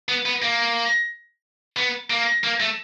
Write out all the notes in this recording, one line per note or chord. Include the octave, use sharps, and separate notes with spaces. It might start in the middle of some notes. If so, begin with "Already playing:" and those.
B3
B3
A#3
B3
A#3
A#3
A3